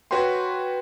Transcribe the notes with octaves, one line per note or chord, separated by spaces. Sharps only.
F#4 B4 C#5 G5 C6